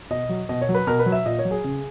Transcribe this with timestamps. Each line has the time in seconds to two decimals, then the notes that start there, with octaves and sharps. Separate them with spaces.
0.10 B2 D#5
0.29 F#3
0.49 B2 D#5
0.62 C#5
0.69 F#3
0.75 B4
0.87 B2 A#4
0.99 B4
1.06 F#3
1.12 E5
1.26 A#2 D#5
1.39 C#5
1.45 F#3
1.51 G#4
1.64 C#3